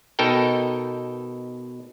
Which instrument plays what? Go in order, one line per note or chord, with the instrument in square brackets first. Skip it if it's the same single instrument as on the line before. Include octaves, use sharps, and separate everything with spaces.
[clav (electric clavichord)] B2 D#4 A4 A#4 G5